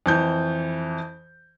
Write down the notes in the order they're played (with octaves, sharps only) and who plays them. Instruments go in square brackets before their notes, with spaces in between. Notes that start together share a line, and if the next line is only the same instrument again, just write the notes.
[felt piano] F2 E3 G6